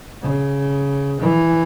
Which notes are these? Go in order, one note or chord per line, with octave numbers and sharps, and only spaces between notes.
C#3
E3